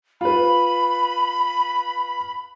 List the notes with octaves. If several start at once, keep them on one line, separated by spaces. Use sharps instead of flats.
F4 B4 B5